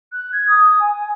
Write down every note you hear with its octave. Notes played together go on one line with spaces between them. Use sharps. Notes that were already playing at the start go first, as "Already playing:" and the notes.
F#6
G#6
D#6
G#5